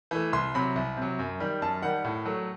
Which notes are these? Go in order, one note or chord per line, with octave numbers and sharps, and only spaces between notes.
E3 A3
C2 C6
C3 F#3 B5
C2
C3 F#3
F#2
D#3 G3
F#2 A5
D#3 G3 F#5
A2
F#3 A3